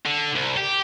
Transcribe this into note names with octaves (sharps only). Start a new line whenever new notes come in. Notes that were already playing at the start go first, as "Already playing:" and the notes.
D3
C2
G4